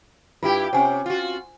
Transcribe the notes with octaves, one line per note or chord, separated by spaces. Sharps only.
G2 E4 F4 G4
C3 C#4 C5 F#5 G#5
F4 F#4